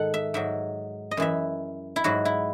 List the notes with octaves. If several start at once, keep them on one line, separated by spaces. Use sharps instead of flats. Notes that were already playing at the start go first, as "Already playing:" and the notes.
Already playing: G#2 D#3 A4 F#5
E5
G#2 F#3 E5
D#5
F#2 E3 E5
E4
G#2 F#3 F#4
E4